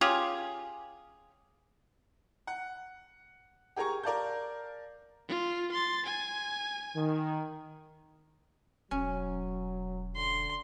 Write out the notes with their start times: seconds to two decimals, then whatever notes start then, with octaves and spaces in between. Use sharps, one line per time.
0.01 C#4 F4 G4 G#4
2.47 F#5
3.76 G4 G#4 A#4 A#5 C#6
4.03 A#4 D5 F5 A5 G6
5.28 F4
5.71 C6 A6
6.05 G#5
6.96 D#3
8.91 E1 F#3 C#4
10.16 D3 C6